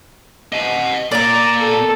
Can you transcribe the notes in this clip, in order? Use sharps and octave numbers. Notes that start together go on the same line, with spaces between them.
D#5 F#5
A#2 D5 A#5
A4